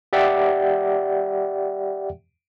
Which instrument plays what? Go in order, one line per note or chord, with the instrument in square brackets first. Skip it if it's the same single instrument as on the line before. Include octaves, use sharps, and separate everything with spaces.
[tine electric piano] G4 D5 E5 F#5 G5